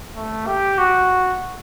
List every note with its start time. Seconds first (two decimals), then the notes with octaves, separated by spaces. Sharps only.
0.16 A3
0.47 G4
0.78 F#4